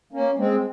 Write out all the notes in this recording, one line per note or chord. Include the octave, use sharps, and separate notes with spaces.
A#3 C#4
G#3 C4